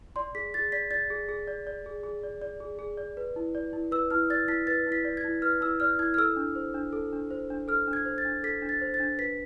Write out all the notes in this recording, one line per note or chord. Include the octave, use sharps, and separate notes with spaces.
D5 C6
G#4 B6
G#4 A6
D5 B6
D5 A6
G#4
G#4
D5
D5
G#4
G#4
D5
D5
G#4
G#4
D5
B4
E4
D5
E4
B4 E6
E4 F6
D5 A6
E4 B6
B4 A6
E4
B6
D5
G#6
E4
B4 F6
E4 E6
D5 F6
E4 G#6
F6
A4 E6
D4
C5
D4
A4
D4
C5
D4
A4 F6
D4
G#6
C5
A6
D4
A4 B6
D4
A6
C5
A6
D4
B4 B6